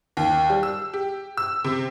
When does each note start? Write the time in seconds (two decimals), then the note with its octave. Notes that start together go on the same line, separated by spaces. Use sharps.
0.17 D#2
0.50 G3
0.63 E6
0.94 G4
1.37 E6
1.64 C3